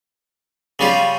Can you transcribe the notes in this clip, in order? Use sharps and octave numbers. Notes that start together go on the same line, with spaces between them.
C#3 G3 C#4 F4